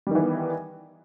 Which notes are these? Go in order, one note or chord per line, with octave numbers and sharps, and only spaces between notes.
D#3 E3 G3 B3